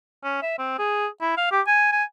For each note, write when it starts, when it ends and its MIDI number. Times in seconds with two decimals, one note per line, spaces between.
0.24 0.40 61
0.42 0.56 76
0.59 0.75 60
0.79 1.07 68
1.21 1.37 64
1.37 1.49 77
1.51 1.61 67
1.67 1.89 80
1.92 2.04 80